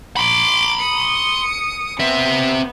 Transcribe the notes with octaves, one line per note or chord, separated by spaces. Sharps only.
B5 C6 D6
D#6 C#7
B3 C4 E5